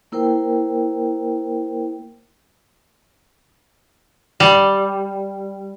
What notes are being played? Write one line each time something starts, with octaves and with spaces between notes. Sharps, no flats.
A#3 E4 A#4 C5 G5
G3